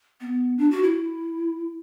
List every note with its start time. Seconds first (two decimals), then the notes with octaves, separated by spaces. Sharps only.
0.21 B3
0.58 D4
0.71 F#4
0.83 E4